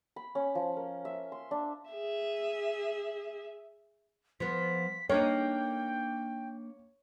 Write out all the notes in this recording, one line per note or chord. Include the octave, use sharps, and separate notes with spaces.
B5
C#4
F3
A#4
E5
C6
D4
G#4 E5
F3 B3 B6
A#3 D4 D#4 C#5 G5